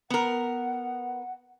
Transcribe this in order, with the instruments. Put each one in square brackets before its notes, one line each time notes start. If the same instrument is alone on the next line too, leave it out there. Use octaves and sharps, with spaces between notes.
[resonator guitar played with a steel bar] B3 A#4 [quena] F#5